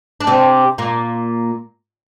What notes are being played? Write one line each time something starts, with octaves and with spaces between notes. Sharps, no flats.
D4
C3 C4
A#2 A#3